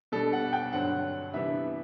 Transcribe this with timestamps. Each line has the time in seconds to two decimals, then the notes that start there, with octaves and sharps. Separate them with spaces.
0.12 B2 G3 D4 A4
0.33 F#5
0.53 G5
0.72 G2 D3 F#3 C4 F#5
1.33 C3 E3 G3 B3 D4 E5